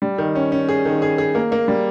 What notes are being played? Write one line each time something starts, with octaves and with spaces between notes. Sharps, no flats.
G3
D#3
C#4
C#4
G#4
D#3
G#4
G#4
A#3
A#3
G3